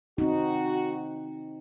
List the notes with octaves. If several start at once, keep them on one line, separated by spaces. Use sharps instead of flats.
C4 D#4 F#4